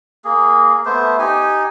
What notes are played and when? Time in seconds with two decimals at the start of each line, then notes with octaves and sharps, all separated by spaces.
0.25 A#3 G#4
0.86 A3 B3 C5
1.19 D#4 G4 G#5